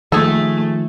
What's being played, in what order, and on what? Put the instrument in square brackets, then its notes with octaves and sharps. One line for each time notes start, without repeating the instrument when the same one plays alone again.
[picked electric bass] D#3 F3 [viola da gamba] A3 [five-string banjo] G#4 A4